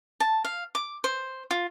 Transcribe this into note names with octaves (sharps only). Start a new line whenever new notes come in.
A5
F5
D6
C5
F4